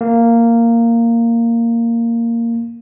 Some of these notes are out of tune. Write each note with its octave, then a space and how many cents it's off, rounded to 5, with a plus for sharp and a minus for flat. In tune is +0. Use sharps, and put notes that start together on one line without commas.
A#3 -10